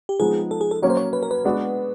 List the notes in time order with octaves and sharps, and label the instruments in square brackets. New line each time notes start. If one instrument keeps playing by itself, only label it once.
[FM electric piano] G4
[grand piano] F3 G#3 B3 D#4 [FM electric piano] G#4
[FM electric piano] A4
G#4
A4
[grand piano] F#3 A#3 C#4 [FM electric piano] C#5
[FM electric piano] C5
C#5
B4
A#4
B4
[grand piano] G#3 B3 D4 F#4